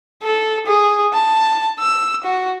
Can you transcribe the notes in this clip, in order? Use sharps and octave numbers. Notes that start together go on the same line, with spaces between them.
A4
G#4
A5
E6
F#4